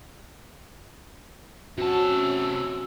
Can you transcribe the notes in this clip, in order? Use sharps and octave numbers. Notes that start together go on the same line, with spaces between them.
C3 C#4 F#4 A5 E6